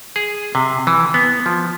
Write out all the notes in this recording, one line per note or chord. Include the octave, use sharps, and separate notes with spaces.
G#4
C3
E3
B3
F3